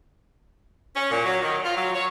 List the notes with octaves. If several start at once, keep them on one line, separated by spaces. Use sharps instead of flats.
C#4
A#2
F#3
D#3
F4
F#3
C#5